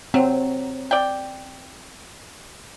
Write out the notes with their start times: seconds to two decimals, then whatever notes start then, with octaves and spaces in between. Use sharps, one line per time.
0.14 F#3 C4
0.91 D5 G5